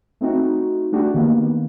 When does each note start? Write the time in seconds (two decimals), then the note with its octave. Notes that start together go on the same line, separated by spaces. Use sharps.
0.21 A3 C4 D#4 F#4
0.92 A3 D4 F#4 G4
1.14 D#3 A#3 B3